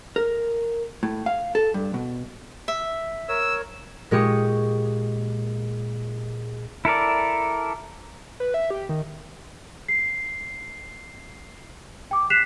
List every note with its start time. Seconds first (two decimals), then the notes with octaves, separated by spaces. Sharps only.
0.16 A#4
1.03 A2
1.26 F5
1.55 A4
1.74 G2
1.94 B2
2.68 E5
3.29 A#4 C#5 E6
4.11 A#2 G#3 G4 C#6 D#6
6.85 E4 A4 A#4 D5
8.40 B4
8.54 E5
8.70 G4
8.89 D#3
9.88 C7
12.11 G5 D6
12.30 F#6 B6 C7 E7 F7